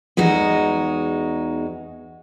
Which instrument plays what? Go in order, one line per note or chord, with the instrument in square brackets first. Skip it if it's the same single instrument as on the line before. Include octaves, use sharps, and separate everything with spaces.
[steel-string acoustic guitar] E2 G#3 D#4 F#4